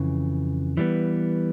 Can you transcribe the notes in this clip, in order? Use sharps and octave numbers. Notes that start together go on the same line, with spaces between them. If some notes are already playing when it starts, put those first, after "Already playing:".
Already playing: F2 C#3 E3
E3 G3 B3